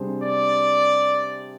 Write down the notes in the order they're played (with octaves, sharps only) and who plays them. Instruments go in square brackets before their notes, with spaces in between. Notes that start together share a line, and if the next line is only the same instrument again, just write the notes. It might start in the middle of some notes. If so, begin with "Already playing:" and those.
Already playing: [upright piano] C3 G3 D4 G#4 C5
[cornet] D5